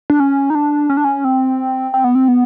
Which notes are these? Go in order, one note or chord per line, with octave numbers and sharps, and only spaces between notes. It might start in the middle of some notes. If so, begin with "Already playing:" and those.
D4
C#4
D#4
D4
C#4
D4
C#4
C4
C4
B3
C4
B3